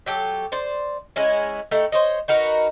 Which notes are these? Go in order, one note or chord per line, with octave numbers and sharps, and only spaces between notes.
F#3 G4 A4
C5 D5
G#3 C#4 E4
A3 D#4 G4
C5 C#5 D#5
D#4 F#4 A#4 B4